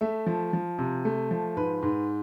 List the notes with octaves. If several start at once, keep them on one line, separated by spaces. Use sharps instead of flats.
A3 E5
F3
F3
C3
A3
F3
G#2 B4
G#2